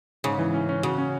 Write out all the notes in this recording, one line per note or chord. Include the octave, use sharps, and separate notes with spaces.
G#2 C#3
E3
C#4
C#4
C#3 F#4
C#4